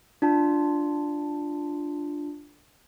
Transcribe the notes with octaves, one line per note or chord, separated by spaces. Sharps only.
D4 F4 A5